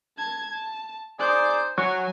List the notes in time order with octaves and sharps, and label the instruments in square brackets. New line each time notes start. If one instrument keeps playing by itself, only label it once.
[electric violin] A5 G#6
A5
[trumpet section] D#4 G#4 D5 [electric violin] C5 G6
[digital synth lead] F#3 [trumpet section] C#5 C#6 [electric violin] G#5